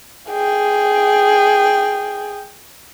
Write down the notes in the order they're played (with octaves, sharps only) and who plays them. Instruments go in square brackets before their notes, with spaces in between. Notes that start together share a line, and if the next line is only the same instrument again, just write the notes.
[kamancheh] G#4 G5